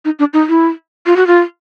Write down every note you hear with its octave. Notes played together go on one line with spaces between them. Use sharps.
D#4
D4
D#4
E4
F4
F#4
F4